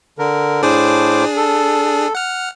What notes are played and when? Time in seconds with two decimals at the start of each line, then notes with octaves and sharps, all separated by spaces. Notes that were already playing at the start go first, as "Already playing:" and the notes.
0.19 D3 A#4
0.63 A2 D4 G#4 C5 D6
1.37 A4
2.15 F#5 F6